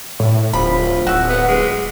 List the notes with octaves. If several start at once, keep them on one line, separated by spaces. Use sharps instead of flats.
A2
D1 F3 B5
D1 F#4 E6
B3
G#3